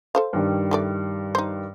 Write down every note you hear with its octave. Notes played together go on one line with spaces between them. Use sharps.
A4 C5 F5
G2 D#3 G3
E3 A3 D5
D#4 C5